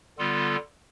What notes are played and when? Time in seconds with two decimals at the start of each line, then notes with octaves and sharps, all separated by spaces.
0.18 D3 G3 B3 F4 A4